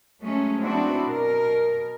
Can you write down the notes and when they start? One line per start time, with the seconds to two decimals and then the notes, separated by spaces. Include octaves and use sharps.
0.21 F#3 G#3 A3 C#4
0.60 F#3 B3 C4 D4 E4 F#4
1.08 B2 A#4